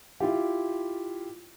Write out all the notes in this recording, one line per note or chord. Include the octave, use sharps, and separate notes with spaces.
E4 F4 G4